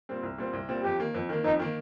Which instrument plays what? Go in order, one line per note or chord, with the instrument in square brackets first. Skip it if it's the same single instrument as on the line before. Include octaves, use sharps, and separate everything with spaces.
[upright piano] A#2 G3 C4
C2
A#2 G3 C4
C2
A#2 G3 C4
[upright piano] F2 [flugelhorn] G4
[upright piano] D#3 A#3
F2
D#3 A#3
[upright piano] F2 [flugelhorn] D#4
[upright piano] D#3 A#3